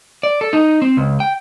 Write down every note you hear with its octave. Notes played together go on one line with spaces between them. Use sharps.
D5
A4
D#4
C4
C#2
G5